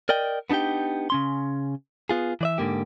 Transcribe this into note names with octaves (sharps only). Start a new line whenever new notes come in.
A#4 D5 D#5 G5
B3 D4 D#4 G4 G5
C#3 C#4 C6
B3 F4 G#4
E3 D5 E5
G#2 D3 A#3 G4